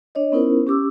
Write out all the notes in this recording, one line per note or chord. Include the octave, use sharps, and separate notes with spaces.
D4 C#5 D#5
B3 C#4 D#4 E4 A#4 C5
C#4 G4 D6 E6